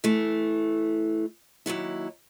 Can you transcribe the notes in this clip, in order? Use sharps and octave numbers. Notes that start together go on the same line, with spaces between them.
E3 A3
D#2 G#2 F#3 E4